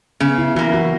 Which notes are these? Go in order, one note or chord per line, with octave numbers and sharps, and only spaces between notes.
C#3 B3
E4
E3 A#3 F#4
F#4